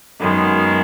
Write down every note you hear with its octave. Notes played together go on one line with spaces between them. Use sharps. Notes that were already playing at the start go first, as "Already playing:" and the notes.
F#2 D#3 G#3 B3